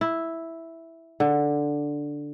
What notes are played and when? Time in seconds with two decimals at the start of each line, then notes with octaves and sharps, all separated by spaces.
0.01 E4
1.20 D3